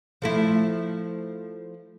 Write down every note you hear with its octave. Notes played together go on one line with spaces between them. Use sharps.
F3 A3 E4